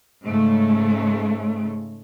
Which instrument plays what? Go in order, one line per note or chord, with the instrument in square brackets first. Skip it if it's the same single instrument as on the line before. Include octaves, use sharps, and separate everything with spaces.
[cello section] G#2 C#3 A3